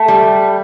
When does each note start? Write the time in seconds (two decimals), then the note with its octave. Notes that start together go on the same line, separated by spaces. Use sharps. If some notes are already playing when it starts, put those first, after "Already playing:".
Already playing: A3
0.08 G3